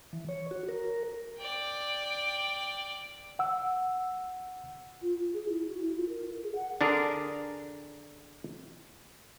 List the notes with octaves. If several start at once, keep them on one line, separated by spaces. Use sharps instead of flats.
E3
C#5
F#4
A#4
D5 G5
F#5 E6
F4
F4
G#4
E4
F#4
E4
F4
A#4
A#4
G#4
F#5
D3 D4 G#4 A#4